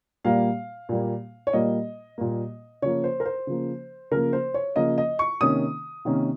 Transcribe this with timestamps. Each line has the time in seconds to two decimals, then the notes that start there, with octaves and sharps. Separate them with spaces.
0.24 A#2 G3 A#3 F5
0.89 A#2 G3 A#3
1.47 C#5
1.53 A#2 G3 A#3 D#5
2.18 A#2 G3 A#3
2.82 C#3 F3 A#3 C#5
3.04 C5
3.20 A#4
3.25 C5
3.47 C#3 F3 A#3
4.11 C#3 F3 A#3 A#4
4.33 C5
4.54 C#5
4.76 C#3 F3 A#3 D#5
4.98 D#5
5.19 C#6
5.41 C3 D#3 A#3 C#4 D#6
6.05 C3 D#3 A#3 C#4